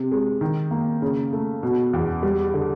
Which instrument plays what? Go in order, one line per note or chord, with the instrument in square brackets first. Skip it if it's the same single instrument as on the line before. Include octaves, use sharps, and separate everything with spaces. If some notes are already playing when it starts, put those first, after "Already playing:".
Already playing: [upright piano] C3
G#3
D#3
A#3
C#3
A3
B2
E2
G3
D3